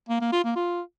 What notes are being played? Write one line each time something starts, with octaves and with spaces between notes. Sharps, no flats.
A#3
A#3
F4
A#3
F4